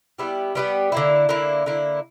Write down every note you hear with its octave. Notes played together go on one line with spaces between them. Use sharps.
G3 B3 E4 G4
G3 B3 E4 G4
D3 A#3 E4
D3 A#3 E4
D3 A#3 E4